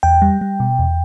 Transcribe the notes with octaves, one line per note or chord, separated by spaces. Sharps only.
E2 G5
G3
G3
B2
E2